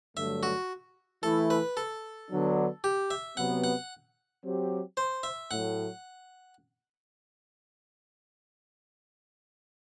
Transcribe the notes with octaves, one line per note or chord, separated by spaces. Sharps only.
G2 D3 F#3 A3 E5
F#4
E3 A3 E4 A4
B4
A4
D3 F#3 B3 D4
G4
E5
C3 F#3 B3 F#5
F#5
F#3 C4 G4
C5
E5
A2 F#3 A3 F#5